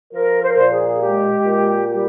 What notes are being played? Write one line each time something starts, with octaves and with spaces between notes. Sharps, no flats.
F3 A#4
C5
A#4
A#2 C5
G#4
G#3 G4
A#2
G3 G4